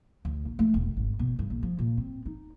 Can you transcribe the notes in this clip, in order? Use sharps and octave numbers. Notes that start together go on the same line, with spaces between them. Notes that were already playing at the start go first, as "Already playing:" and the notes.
D2
A#1
A3
E1
G#1
B2
G2
A#1
F3
A#2
C4
D#4